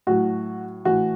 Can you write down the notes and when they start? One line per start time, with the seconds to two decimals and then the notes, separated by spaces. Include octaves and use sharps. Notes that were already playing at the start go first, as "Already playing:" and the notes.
0.07 A2 F#3 F#4
0.85 A2 E3 F#4